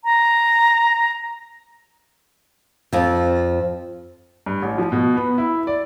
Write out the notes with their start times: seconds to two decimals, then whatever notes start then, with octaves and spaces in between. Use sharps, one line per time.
0.04 A#5
2.93 F2 F3
4.46 G2
4.62 A1
4.78 F3
4.92 B2
5.16 B3
5.38 E4
5.67 D5